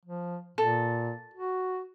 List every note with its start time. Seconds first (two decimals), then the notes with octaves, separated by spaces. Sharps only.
0.05 F3
0.58 A#2 A4
1.34 F#4